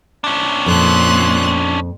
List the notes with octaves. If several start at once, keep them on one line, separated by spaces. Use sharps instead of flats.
C#4 D4
F2 A#2 C6 F#6